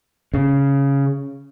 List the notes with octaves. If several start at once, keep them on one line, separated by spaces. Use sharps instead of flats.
C#3